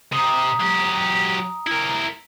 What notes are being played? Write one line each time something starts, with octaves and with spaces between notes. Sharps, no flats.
C3 A#5 D#6
F#3 G4
E4 A#4